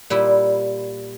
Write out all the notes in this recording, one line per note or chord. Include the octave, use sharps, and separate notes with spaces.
A#2 G3 E4